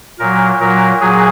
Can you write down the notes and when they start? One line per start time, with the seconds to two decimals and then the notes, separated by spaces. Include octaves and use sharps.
0.19 A#2 F#3 A#4
0.60 A#2 F#3 A#4
1.00 A#2 F#3 G#4